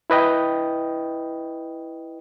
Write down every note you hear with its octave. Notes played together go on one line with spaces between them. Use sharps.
E4 B4 D#5 G5